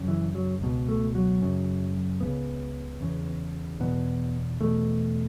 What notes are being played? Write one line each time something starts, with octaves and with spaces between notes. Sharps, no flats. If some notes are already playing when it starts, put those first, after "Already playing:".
Already playing: F#2 C#3
E3
F#3
C#2 B2
A3
F#3
F#2 C#3
C#2 C#3 B3
E2 C#3
E2 B2 B3
E2 B2 A3